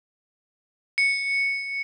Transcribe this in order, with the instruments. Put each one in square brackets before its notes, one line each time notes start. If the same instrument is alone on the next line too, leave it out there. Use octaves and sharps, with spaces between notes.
[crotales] C#7